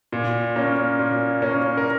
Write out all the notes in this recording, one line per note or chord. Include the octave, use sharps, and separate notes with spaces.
A#2
A#3 C#4
A#2
A#3 C#4
A#4